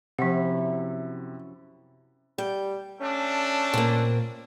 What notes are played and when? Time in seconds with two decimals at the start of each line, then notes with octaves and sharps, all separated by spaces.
0.19 F#2 C3 F3 E4 F#5
2.38 G3 G5
3.01 A3 C#4 D4
3.74 A#2 A#3 C4